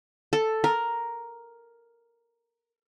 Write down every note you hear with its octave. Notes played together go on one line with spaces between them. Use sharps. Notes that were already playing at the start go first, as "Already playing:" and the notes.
A4
A#4